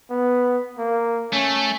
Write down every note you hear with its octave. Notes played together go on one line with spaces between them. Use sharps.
B3
A#3
A3 C#4